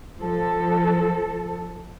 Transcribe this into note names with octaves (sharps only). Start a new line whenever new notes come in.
F3 A4